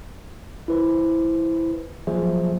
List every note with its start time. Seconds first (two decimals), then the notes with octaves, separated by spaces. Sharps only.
0.68 E4 B4 C5
2.07 F3 F#3 A#3 G#4 C5 E5